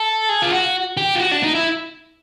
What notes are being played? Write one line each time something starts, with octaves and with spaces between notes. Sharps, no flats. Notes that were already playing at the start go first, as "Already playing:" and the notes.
Already playing: A4
G#4
F4
F#4
G4
F4
F#4
D4
D#4
E4